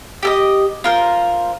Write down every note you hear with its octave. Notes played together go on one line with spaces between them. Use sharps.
G4 A4 D#5
F4 A#4 C5